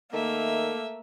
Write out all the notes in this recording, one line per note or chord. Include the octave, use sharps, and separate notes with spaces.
D#3 A3 A#3 E5